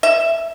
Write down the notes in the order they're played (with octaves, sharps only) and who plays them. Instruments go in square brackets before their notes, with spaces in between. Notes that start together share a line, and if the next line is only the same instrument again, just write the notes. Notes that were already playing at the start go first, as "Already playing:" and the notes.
[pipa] E5